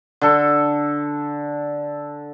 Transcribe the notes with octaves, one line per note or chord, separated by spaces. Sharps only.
D3 A4